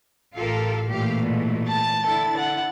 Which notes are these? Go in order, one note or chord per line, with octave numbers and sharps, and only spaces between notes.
A1 F4 G4 A4 A#4 F5
A#2 E3 A3 G4 F5
G#2 B2
A5 A6
D3 E4 A4
F#5